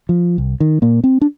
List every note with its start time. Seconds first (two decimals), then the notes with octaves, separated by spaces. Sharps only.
0.09 F3
0.38 C2
0.60 D#3
0.82 A#2 A#3
1.04 C4
1.21 D4